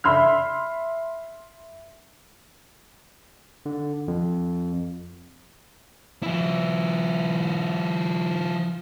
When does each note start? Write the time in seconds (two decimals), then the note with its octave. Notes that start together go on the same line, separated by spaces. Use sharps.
0.04 E5 B5 C6 E6 F6
3.66 D3
4.08 F2
6.23 F3 E4